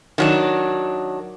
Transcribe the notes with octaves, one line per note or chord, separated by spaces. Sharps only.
D#3 F#3 D4